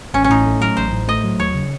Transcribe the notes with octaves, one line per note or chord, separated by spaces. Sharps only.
A1 C#4
C#4
A2 D#4
A3
F#3 A#4
A1 C5
A2
A3 D#5
F#3
D#2 C#5
C#3